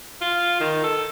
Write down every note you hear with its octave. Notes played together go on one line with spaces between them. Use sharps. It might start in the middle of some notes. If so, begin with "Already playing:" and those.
F4
D#3
A4